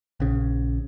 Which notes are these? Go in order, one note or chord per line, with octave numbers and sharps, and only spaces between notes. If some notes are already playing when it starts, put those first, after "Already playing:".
A#1 C#3